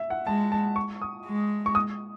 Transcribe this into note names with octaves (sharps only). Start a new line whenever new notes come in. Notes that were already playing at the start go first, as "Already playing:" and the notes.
Already playing: E5
F#5
G#3 A5
A5
C#6
D#6
G#3
C#6
D#6